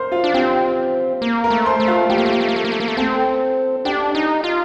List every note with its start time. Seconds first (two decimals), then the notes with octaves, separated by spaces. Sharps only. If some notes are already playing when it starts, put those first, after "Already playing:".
Already playing: A#4 C5 C6
0.12 F4 F5
0.24 D4
0.34 C4 G4 G5
1.22 A#3
1.44 A#4 A#5
1.50 A3
1.66 C5 C6
1.80 A3
1.88 F4 F5
2.10 A3 G4 G5
2.18 A#3
2.26 A3
2.33 A#3
2.41 A3
2.49 A#3
2.56 A3
2.65 A#3
2.72 A3
2.80 A#3
2.88 A3
2.97 C4 A4 A5
3.85 D4 G4 G5
4.15 D#4
4.44 F4